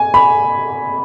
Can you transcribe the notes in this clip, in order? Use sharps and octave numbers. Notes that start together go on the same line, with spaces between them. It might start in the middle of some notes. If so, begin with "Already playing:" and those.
Already playing: G#5
B5